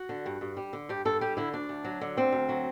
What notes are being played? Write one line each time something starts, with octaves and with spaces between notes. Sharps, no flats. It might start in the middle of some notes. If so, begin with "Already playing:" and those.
Already playing: F#4
D3
G2
G2
G3
D3
G2 G4
G2 A4
G3 G4
D3 E4
D2 D4
D2
F#3
D3
D2 C4
D2
F#3